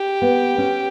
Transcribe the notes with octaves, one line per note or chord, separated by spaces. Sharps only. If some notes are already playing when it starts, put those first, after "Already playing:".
Already playing: G4
B3
C#4